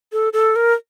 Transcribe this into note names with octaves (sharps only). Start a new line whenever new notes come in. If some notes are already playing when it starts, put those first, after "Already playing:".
A4
A4
A#4